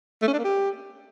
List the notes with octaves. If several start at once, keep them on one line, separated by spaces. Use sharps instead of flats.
A3
C#4
D4
A#3
G4